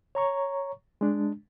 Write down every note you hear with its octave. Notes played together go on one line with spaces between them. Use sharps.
C#5 A#5 C#6
G#3 D4